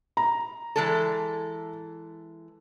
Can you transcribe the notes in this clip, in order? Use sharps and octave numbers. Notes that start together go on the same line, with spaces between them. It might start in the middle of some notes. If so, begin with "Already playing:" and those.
A#5
E3 G#3 A4